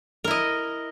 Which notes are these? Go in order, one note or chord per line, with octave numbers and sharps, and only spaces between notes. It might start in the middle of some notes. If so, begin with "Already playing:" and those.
E4 A#4 D#5